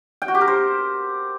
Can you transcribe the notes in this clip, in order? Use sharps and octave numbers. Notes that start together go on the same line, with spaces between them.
G5
F#4
G4
A#4
C5